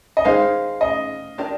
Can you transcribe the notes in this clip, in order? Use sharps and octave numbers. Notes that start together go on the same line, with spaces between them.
D#5
D#3 G#3 D#4 G#4 C5 F5
D#5
D4 G4 A#4